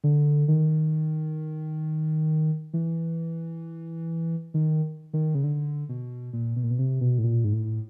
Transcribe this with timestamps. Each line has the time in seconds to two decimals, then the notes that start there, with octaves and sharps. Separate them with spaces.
0.04 D3
0.48 D#3
2.74 E3
4.54 D#3
5.13 D#3
5.35 C#3
5.43 D3
5.89 B2
6.33 A#2
6.56 B2
6.64 A#2
6.71 B2
6.79 C3
7.01 B2
7.19 A2
7.24 A#2
7.44 G#2
7.53 A2